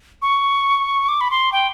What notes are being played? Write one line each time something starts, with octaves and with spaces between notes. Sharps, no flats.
C#6
D6
B5
C6
G5